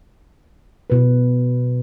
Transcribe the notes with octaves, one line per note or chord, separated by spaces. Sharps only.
B2 B4